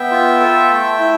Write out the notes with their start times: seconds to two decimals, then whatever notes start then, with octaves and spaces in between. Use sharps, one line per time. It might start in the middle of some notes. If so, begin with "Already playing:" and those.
Already playing: B3 E5 G5
0.11 F4
0.40 A4
0.69 A3
0.99 E4